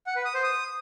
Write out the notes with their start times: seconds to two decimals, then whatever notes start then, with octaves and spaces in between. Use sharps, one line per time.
0.07 F#5
0.16 B4
0.25 D#6
0.34 C5
0.43 D#6